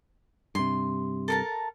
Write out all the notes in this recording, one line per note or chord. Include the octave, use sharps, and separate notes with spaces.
G2 C3 C6
A4 A#4 A5